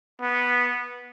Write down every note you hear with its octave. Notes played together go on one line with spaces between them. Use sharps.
B3